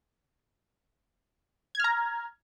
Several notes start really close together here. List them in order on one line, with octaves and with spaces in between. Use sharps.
G#6 F6 A#5